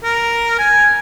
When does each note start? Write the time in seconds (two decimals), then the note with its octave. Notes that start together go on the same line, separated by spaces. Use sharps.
0.04 A#4
0.59 G#5